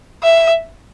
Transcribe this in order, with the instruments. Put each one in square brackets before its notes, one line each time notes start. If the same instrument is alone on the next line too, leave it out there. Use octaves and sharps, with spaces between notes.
[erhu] E5